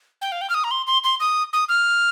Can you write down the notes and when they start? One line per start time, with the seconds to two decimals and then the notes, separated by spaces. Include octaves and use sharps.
0.22 G5
0.32 F5
0.41 G5
0.50 F6
0.54 D#6
0.64 A#5
0.71 C6
0.87 C6
1.04 C6
1.20 D#6
1.53 D#6
1.69 F6